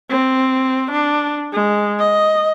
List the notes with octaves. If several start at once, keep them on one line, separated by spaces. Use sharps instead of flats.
C4
D4
G#3
D#5